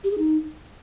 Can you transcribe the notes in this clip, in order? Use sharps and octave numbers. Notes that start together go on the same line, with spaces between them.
G4
G#4
D#4